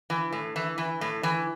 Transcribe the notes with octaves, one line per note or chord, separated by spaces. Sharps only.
E3
A2
E3
E3
A2
E3